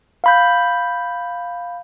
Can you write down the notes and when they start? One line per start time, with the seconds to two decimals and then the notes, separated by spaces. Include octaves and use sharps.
0.24 F5 B5 G6